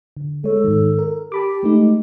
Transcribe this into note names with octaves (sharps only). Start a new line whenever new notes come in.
D3
G#3 A4 C#5
G#2 D#3
A#4
G4 A5 B5 D6
G#3 A3 D#4